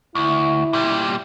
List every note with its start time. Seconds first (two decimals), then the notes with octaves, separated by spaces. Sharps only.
0.15 D2 E4
0.73 A#2 G3